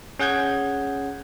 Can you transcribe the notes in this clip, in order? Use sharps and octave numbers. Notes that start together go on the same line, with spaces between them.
C#4 G#4 F#5 G6 G#6